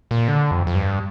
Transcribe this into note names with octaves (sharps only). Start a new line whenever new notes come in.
A#2
D3
F2
F2
G2